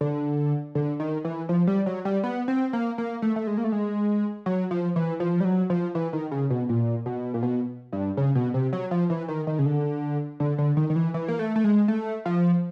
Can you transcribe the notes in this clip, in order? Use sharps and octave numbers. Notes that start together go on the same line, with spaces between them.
D3
D3
D#3
E3
F3
G3
F#3
G3
B3
C4
A#3
A#3
A3
A3
G#3
A#3
A3
G#3
F#3
F3
E3
F3
G3
F#3
F3
E3
D#3
C#3
B2
A#2
B2
A#2
B2
G2
C#3
B2
C3
F#3
F3
E3
D#3
D#3
C#3
D3
D3
D3
D#3
D#3
E3
E3
A#3
A3
A3
G#3
A3
F3